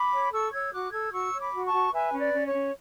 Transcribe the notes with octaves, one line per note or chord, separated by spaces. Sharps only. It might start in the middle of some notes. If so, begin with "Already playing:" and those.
Already playing: B5 D6
C#5
A4 C#6 E6
C#5 E6 G#6
F#4 D6 F#6
A4 E6 G#6
F#4 C#6 E6
C#5
B5 D6
F#4
A5 C#6
F#4
B4 E5 G#5
C#4
D5
C#4
C#5
C#4